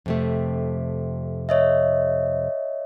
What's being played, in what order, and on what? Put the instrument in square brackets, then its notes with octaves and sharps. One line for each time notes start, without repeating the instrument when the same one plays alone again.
[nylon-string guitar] F2 C3 A3
[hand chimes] C#5 D#5 E5